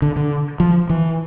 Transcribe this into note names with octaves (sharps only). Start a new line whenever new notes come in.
D3
D3
F3
E3